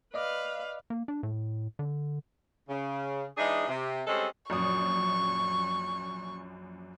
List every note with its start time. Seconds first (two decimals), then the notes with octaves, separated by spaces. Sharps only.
0.14 B4 D5 D#5 F5 D6
0.90 A#3
1.08 D4
1.23 A2
1.79 D3
2.69 C#3
3.38 E3 G#3 D4 D#4 G#4
3.68 C3
4.07 G3 G#3 C4 C#4 A4
4.50 A#1 F#2 C#6 D#6